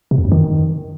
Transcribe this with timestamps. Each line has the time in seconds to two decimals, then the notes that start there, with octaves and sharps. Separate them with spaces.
0.11 C3
0.18 F2
0.25 F#2
0.32 D#3